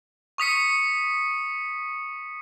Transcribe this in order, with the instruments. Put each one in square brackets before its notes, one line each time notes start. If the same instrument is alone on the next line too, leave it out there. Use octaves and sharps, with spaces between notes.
[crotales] C#6 D#6 B6 C#7